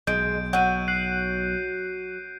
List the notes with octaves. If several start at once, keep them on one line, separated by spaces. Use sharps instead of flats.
B1 G#3 G6 D7
F#3 F#4 F#5 G6 D#7
F#6 C7